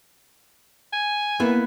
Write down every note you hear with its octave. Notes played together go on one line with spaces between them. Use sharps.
G#5
A#3 B3 E4